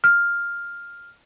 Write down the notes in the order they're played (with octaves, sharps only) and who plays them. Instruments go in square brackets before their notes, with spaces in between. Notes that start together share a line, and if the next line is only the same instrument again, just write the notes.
[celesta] F6